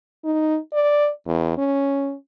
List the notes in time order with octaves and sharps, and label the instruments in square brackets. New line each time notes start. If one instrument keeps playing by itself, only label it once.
[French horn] D#4
D5
E2
C#4